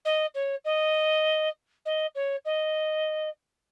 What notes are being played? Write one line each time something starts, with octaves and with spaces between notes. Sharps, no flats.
D#5
C#5
D#5
D#5
C#5
D#5